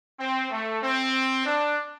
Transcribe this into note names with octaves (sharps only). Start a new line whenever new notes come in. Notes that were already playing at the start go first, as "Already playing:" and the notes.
C4
A3
C4
D4